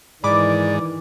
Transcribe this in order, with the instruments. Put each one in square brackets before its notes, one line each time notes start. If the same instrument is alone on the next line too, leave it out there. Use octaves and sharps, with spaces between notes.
[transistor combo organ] G#2 [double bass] D#3 E3 [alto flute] D5 [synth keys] B5 D6